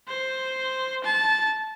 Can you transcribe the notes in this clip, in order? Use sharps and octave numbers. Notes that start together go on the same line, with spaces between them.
C5
A5